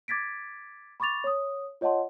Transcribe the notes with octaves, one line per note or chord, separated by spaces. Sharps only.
D6 G#6 A6 B6 D7
B5 C#6 D6 A6 F7
C#5 D#6
F4 C#5 D#5 F#5 A5 C6